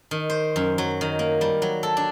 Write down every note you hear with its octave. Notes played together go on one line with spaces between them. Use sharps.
D#3
C5
F#2
F#3
D#3
A#3
G3
F#3
A4
D4